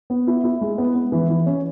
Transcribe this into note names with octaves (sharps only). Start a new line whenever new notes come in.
B3
E4
E4
G#3
B3
B3
E3
E3
C#4